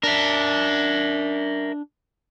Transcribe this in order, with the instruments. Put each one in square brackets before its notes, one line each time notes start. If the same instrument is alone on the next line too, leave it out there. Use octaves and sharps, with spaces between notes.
[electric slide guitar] D4 [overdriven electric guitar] A#4 E5